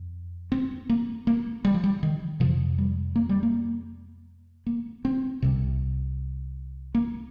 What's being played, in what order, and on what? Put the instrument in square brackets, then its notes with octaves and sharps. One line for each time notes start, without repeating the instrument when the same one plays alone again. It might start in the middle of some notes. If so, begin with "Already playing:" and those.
Already playing: [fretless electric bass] F2
C4
A#3
A#3
G3
F3
G3
D#3
F2 C3 F3
G3
A#3
G3
A#3
A#3
C4
C2 C3
A#3